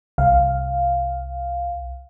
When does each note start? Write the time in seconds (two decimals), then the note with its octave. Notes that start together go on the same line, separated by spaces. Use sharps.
0.18 C2 F5